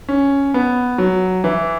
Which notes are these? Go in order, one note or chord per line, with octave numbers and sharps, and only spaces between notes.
C#4
B3
F#3
E3